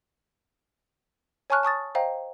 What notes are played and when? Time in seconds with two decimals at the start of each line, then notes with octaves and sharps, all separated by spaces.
1.50 C#5 G#5 A5 C#6 F6 F#6
1.63 A5 C#6 D#6 A6
1.95 C5 D#5 F5 G5 A#5